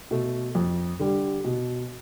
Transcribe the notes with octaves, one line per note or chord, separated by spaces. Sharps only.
B2 A3
F2
D3 G3
B2